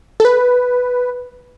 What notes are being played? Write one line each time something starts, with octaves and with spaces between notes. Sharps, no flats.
A4
B4